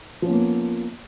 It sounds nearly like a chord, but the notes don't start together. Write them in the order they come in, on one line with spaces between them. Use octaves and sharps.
F3 C#4 B3 A#3